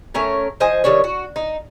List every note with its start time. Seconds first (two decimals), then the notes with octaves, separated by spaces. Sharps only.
0.14 A3 C#4 A#4 C#5
0.60 F3 C5 D#5 G#5
0.84 D#3 G3 D4 C#5
1.04 F#4
1.36 D#4